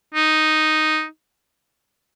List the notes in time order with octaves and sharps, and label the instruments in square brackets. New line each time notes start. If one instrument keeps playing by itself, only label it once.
[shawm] D#4